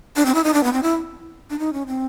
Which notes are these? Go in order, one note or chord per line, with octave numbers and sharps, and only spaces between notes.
D4
C4
E4
D#4
D4
B3
C4
E4
D4
D#4
C#4
C4